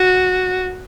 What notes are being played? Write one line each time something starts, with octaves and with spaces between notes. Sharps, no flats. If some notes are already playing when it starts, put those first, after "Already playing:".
Already playing: F#4